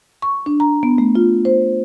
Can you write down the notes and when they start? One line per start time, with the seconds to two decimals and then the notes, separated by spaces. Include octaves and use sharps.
0.22 C#6
0.46 D4
0.60 A#5
0.83 B3
0.98 A3
1.15 F4
1.45 C5